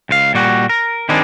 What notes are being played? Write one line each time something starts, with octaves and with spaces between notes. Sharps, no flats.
C#2 F5
A#2 G3 F#4
A#4
D#3 G3 G#3 C4 D4